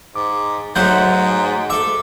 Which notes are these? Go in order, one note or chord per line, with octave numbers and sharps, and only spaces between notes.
G#2 D6
G#2 F#3 A3 C5 F#5 F#6 G6
A4 E5 D6